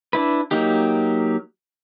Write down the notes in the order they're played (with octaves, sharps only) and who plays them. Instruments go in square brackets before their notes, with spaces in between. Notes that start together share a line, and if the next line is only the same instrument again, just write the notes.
[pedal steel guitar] D4 E4 B4
F#3 A#3 D#4 G4